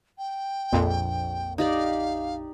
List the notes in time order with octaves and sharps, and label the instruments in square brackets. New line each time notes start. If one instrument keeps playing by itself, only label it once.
[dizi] G5
[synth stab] A#1 F2
[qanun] D#4 G4 D5 [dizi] F5